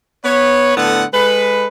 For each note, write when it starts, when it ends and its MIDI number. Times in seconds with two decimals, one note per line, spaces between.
0.25 0.77 59
0.25 0.77 71
0.25 0.77 73
0.77 1.05 45
0.77 1.05 50
0.77 1.05 59
0.77 1.05 69
0.77 1.05 78
1.14 1.66 56
1.14 1.66 69
1.14 1.66 71